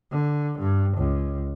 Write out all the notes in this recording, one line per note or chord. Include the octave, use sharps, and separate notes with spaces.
D3
G2
C#2